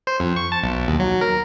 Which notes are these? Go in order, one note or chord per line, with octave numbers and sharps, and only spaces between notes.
C5
F2
C#6
A5
B1
D#2
F#3
A#4